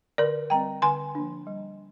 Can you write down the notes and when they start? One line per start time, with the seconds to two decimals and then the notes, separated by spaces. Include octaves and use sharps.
0.18 D3 A#4 D5
0.50 G3 C4 G5 A#5
0.82 D3 G#5 C6
1.15 F3 A#3 D4
1.47 G3